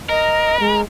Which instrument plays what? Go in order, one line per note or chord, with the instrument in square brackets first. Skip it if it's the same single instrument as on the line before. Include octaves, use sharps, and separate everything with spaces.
[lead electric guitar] A#4 [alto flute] D#5
[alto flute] G#3